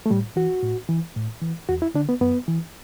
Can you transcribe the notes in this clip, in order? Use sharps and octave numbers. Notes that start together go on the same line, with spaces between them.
A3
A2 G3
E3 F#4
A2
E3
A2
E3
E2 F#4
E4
D3 D4
B3
F#2 B3
E3